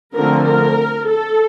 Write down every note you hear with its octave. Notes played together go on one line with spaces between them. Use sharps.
D3 F3 A3 C4 A#4
A#4
A4